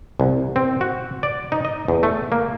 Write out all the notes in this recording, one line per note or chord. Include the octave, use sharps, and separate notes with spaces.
C2
C4
F#4
D5
D#4
D#5
E2
A3
A#3